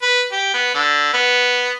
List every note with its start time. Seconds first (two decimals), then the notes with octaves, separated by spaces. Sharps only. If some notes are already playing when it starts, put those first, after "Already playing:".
0.02 B4
0.32 G4
0.54 B3
0.74 D3
1.13 B3